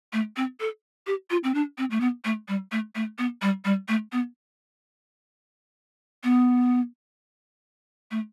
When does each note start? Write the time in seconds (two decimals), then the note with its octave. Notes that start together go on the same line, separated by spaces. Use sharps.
0.13 A3
0.36 C4
0.60 A4
1.07 G4
1.30 F4
1.44 C4
1.54 D4
1.78 C4
1.91 A3
2.00 B3
2.25 A3
2.48 G3
2.72 A3
2.95 A3
3.18 B3
3.42 G3
3.65 G3
3.88 A3
4.12 B3
6.24 B3
8.11 A3